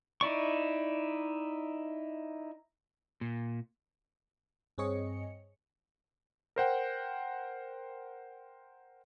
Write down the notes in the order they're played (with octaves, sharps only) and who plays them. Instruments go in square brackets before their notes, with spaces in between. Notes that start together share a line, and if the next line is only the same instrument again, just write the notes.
[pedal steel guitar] D#4 E4 D5 C#6
[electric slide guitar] A#2
[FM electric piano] G2 C4 G#4 C#5 D#5 C#7
[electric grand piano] A#4 C5 F#5 G5